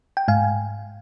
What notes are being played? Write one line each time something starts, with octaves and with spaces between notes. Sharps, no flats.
G5
G#2 F5 G#5